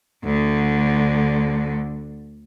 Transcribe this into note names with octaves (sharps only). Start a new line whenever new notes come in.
D2 D3